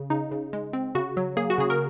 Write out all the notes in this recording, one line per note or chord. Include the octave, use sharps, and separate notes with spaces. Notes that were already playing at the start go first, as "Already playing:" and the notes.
Already playing: C#3
C#3 D#4
C#3
G#3
C4
C#3 F#4
F#3
A#3 G#4
F#4
C#3 G#4
A#4